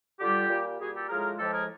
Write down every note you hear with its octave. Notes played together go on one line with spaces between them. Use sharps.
D3 G3 F4 G4
A#2 G3
A#2 G3 F#4 G#4
G4 A4
A2 F3 G#3 G#4 A#4
A2 F3 G#3 G4 A4
G#4 A#4